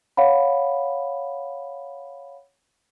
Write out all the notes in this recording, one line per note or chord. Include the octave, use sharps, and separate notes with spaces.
C#5 F5 F#5 B5